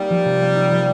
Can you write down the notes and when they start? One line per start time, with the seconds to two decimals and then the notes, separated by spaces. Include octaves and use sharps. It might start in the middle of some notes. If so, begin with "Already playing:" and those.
Already playing: G3 A#3 D#4
0.10 F3
0.25 C3
0.41 A#3
0.56 D#4
0.72 F3